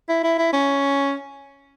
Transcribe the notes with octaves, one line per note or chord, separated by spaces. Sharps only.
E4
E4
E4
C#4